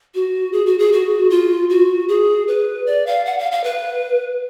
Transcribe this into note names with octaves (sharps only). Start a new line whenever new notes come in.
F#4
G#4
F#4
G#4
F#4
F4
F#4
G#4
B4
D5
F5
F#5
F5
F5
B4